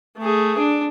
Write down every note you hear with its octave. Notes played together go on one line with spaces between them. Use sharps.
A3 G#4
D4